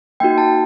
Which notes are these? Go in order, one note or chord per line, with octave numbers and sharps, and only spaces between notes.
A#3 D#4 F#4 G5
A5